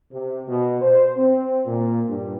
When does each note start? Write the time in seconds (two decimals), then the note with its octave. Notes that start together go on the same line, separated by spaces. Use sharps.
0.12 C3
0.48 B2
0.81 C5
1.17 C4
1.66 A#2
2.08 G2